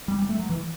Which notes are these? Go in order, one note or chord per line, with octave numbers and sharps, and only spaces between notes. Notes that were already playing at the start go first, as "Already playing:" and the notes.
G3
G3
A3
F#3
E3